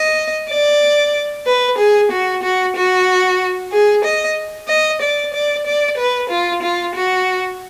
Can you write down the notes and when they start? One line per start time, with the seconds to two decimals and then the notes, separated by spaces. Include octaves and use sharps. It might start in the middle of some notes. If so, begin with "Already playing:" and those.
Already playing: D#5
0.50 D5
1.46 B4
1.78 G#4
2.11 F#4
2.43 F#4
2.76 F#4
3.72 G#4
4.04 D#5
4.68 D#5
5.01 D5
5.33 D5
5.66 D5
5.98 B4
6.30 F4
6.62 F4
6.95 F#4